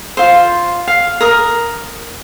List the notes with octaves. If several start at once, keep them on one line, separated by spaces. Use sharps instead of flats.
F4 C5
F5
A#4 D#6